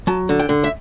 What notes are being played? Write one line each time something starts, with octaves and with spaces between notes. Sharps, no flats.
F#3 A5
D3
G5
D3
E5